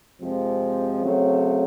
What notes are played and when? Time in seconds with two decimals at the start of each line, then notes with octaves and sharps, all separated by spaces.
0.21 F2 C3 F3 G#3 C4
1.02 C#3 F#3 A3 C4